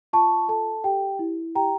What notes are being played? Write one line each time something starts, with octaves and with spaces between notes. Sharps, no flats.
F4 A5 C#6
A4 A5
G4 G5
E4
G4 G5 A#5